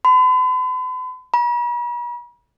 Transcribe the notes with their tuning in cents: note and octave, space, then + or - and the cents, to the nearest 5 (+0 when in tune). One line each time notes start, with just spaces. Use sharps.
B5 +45
B5 -45